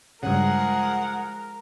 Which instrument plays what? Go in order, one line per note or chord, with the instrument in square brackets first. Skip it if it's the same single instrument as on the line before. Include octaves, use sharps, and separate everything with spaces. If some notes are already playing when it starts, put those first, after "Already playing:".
[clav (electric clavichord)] G2 C#3 [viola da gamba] F3 G#3 G#4 [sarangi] A#4 [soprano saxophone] F#5